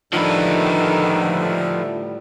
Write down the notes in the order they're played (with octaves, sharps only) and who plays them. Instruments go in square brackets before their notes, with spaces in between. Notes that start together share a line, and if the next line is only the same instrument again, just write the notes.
[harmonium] A2 G3 [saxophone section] D3 A3 [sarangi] D#3 [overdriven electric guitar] F3 B4